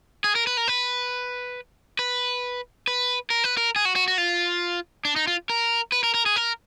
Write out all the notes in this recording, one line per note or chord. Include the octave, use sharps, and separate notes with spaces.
G#4
A#4
B4
A#4
B4
B4
B4
A#4
B4
A#4
G#4
F#4
F#4
F#4
F4
D4
D#4
F4
A#4
B4
A#4
A#4
G#4
A#4